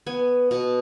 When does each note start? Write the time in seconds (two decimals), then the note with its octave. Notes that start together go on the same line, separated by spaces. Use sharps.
0.07 B3 G#5
0.51 B2